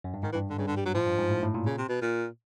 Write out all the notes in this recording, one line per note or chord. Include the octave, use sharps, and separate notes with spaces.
F#2
G2
G#2 D#3
E3
G2
D3
G2 C#3
D3
G3
F#3
A2 F3
G2
G#2
A2
A2
A#2
C#3
C3
B2
A#2